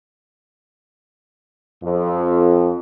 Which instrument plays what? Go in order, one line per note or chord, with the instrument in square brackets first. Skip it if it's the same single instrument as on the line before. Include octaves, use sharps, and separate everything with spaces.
[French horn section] F2